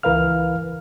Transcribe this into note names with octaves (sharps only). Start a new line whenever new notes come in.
C#2 E3 A#4 B4 F5 F6